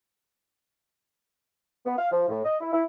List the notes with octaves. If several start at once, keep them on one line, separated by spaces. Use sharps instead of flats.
B3
F5
F3
A2
D#5
E4
E4